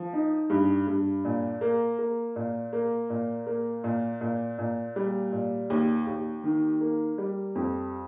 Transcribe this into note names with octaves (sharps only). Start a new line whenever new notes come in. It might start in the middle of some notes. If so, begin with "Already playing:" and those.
Already playing: F3
D#4
G2
G2
A#2
A#3
A#3
A#2
A#3
A#2
A#3
A#2
A#2
A#2
G3
A#2
D#2
D#2
D#3
A#3
G3
F2